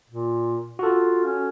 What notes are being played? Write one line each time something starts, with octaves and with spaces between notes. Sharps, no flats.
A#2
F4 F#4 A4
C#4